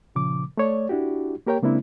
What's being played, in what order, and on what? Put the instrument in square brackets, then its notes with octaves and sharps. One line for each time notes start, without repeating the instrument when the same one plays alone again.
[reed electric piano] A#2 C#3 F3 D6
A3 C#5 D5
D4 E4 F#4 G4
A#3 G4 A#4 C#5 G5
C#3 G#3 A#3 C4 D4 E4